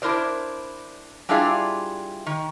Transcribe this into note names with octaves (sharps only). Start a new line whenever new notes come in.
D4 E4 A#4 C5 D5
G3 D4 E4 F4 G#4 D5
D#3